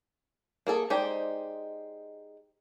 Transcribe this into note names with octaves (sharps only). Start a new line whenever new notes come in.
A#3 G#4 A4
G#3 D#4 G4 C5 D5